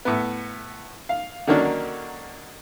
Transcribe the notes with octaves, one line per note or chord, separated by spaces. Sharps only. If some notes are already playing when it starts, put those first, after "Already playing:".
A2 B3
F5
D3 D#3 F#3 A#3 C#4 D4